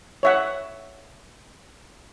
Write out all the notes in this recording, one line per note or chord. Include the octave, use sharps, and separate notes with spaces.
C#5 E5 F#5